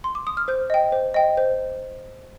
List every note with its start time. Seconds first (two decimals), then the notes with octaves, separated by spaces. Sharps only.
0.04 C6
0.15 D6
0.27 D#6
0.37 F6
0.48 C5 G6
0.70 D#5 G5
0.92 C5
1.14 D#5 G5
1.37 C5